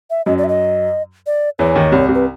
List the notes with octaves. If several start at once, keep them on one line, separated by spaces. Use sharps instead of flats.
E5
F#2 F#3 D#5
D5
E5
D#5
D5
E2 E3 C#5
D#2 D#3
C2 C3
C2 C3
B4